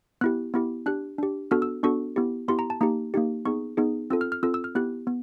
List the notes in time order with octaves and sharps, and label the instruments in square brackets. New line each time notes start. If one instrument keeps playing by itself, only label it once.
[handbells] B3 E4 G4 F#6
B3 E4 G4
D4 G4 F#6
D4 G4
B3 D4 F#4 A4 F6
E6
B3 D4 F#4 A4 C#6
B3 E4 G4
B3 E4 G4 C6
A#5
A5
A#3 D#4 G4 A#5
A#3 D#4 G4
B3 D#4 G#4 C#6
B3 D#4 G#4
C4 F4 A4 E6
F6
F6
C4 F4 A4 E6
E6
F6
B3 E4 G4 F#6
B3